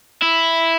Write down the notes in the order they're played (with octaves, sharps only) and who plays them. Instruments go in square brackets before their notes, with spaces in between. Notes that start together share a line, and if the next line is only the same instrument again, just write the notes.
[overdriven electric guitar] E4